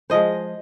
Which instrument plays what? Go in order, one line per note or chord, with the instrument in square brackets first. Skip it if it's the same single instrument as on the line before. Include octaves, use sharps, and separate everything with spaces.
[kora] F3 G#3 C5 D#5